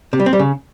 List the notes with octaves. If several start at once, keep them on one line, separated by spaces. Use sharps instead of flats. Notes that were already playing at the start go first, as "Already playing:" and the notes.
C3
G3
C4
G3
C#3